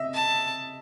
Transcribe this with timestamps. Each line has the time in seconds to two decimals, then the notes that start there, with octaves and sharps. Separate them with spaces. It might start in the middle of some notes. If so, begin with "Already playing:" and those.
Already playing: D#5 E5
0.14 A5